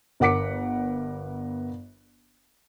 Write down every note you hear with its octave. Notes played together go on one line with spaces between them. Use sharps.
G1 A#4 F#5 D6 B6 C#7